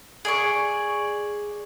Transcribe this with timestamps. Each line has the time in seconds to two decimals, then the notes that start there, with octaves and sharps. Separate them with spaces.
0.25 G#4 D5 C#6